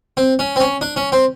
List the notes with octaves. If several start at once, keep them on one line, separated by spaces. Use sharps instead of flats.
C4
C#4
C4
C#4
D4
C#4
C4